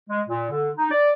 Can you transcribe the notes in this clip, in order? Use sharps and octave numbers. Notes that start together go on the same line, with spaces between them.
G#3
A#2
D3
D#4
D5